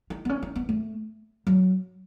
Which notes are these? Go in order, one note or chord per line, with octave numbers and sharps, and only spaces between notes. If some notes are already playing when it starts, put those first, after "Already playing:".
D#4
B3
C#4
D#4
B3
A3
F#3